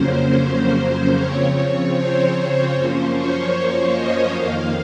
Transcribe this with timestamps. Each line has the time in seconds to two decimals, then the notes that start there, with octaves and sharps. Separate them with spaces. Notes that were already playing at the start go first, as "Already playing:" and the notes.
Already playing: F2 C#3 F#3 A#3 C#4 C5
1.16 C#3 F3 C4 C#5
1.95 C5
2.35 C5
2.74 F#2 F3 A#3 C#4 C5
3.13 C#5
3.54 C#5
3.93 D#5
4.33 F2 D#3 A#3 F5